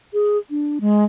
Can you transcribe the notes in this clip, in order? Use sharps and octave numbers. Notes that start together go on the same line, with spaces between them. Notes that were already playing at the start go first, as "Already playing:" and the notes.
G#4
D4
G#3